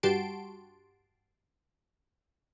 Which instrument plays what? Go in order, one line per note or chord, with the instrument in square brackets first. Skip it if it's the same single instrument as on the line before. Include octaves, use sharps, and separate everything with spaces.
[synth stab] G2 F#4 G4 A5 C6 D7